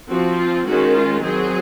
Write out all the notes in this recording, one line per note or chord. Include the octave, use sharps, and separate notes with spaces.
F3 C4 F#4
F4
D#3 G#3 C#4 F#4
F4
F#3 C4 G#4